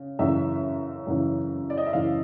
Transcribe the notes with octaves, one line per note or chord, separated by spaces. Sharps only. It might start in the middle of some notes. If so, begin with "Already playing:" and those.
Already playing: C#3
F#2 C#3 E3 E5
F#2 C#3 E3
D5
D#5
E5
F#2 C#3 E3 F5